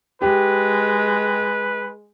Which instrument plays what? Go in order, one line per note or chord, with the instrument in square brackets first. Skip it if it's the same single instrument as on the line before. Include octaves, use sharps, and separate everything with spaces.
[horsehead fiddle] G#3 [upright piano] G4 [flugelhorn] B4